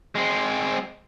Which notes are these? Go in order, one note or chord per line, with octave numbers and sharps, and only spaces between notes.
G#3 C4